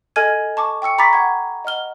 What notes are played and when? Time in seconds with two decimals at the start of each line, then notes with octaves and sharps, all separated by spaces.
0.16 A4 D#5 G#5 F6 G#6 D#7
0.57 A5 C#6 D6
0.82 G5 C#6 E6 C#7
0.98 A#5 B5 C#6 D6 A6 B6
1.13 F#5 C#6 G#6
1.65 D#5 F#5 F6 G7